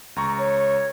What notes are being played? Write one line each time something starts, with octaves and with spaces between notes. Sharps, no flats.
C#2 A#5 C#6
C#5